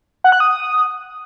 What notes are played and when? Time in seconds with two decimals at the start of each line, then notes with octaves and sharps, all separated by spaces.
0.24 F#5
0.32 F#6
0.40 D#6